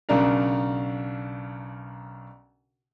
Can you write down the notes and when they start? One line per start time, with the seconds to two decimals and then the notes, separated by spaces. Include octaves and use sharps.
0.09 B1 C#3 D4 A#4